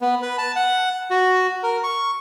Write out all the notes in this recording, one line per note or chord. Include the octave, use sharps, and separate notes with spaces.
B3
B4
A5
F#5
F#4
A#4
C#6